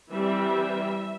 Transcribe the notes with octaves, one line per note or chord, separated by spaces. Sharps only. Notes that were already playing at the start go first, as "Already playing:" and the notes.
E3 G3 C4 E5